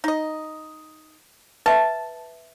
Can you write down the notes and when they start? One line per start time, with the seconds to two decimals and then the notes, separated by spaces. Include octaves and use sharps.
0.04 D#4 D#5
1.66 B4 E5 A5